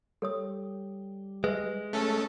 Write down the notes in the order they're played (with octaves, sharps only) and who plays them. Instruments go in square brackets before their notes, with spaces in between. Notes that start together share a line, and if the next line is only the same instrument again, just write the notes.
[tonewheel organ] G3 [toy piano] A4 C#5 D#6
[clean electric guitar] G#3 [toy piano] B4 D#5 E5
[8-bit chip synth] A3 C#4 A4